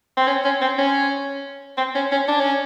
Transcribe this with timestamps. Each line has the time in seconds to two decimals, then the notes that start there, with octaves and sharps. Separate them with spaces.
0.17 C4
0.27 C#4
0.44 C#4
0.61 C4
0.78 C#4
1.77 C4
1.95 C#4
2.12 C#4
2.28 D4
2.40 C#4